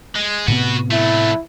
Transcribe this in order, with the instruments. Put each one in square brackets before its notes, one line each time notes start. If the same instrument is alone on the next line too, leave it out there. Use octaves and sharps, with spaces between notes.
[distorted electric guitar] G#3
[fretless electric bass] A2 C3 B3 [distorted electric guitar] F#4 B4
[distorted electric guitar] F#3 A3 [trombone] E4